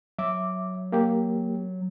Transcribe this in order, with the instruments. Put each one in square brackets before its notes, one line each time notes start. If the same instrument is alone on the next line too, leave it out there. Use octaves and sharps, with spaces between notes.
[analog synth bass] F#3 [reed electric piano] E5 D6
[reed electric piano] A#3 G4